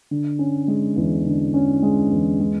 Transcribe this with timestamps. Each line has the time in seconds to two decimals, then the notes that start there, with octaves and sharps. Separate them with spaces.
0.11 D3
0.39 C#4
0.68 G#3
0.96 E2
1.26 D3
1.54 C#4
1.83 G#3
2.11 E2
2.40 G#3